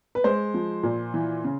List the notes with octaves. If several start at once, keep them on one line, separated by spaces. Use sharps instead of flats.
B4
G#3 C5
F3
A#2
E3
C#3